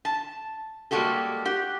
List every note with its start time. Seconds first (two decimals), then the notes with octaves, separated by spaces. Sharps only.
0.05 A5
0.91 G3 G#3 A#3 F#4 G4 A4
1.45 G4 F#5